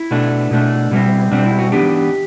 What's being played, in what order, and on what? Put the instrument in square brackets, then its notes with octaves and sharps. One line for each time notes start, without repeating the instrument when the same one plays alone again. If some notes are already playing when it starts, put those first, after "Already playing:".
Already playing: [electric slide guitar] E4
B2 A3 D4
B2 A3 D4
B2 G3 C4
B2 G3 C4 D4
E4
F#4
E3 B3 D4 G4